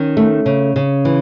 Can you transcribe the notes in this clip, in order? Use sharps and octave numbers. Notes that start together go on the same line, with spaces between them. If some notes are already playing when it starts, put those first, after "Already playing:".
Already playing: D#3 C#4
A3
C#3
C#3
E3